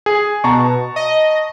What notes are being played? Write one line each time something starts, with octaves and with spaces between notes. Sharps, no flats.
G#4
B2 A5 A#5 C#6
D#5